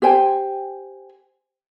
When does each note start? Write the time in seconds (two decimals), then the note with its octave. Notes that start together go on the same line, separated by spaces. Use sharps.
0.02 G4 C5 G5 G#5